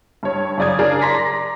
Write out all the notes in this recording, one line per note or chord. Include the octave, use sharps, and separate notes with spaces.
G2 C#5
F#2 C#3 D5 D#6 G#6
D4 G#4 A#4 D5
D5 A#5 C6 A#6 B6